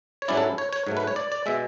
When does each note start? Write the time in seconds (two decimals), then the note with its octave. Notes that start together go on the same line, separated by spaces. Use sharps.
0.22 C#5
0.28 G#2 F#3 C#4 E4 D5
0.37 A4
0.58 C#5
0.73 C#5
0.87 G#2 F#3 A3
0.97 B4
1.07 C#5
1.16 D5
1.32 D5
1.46 B2 G#3 E5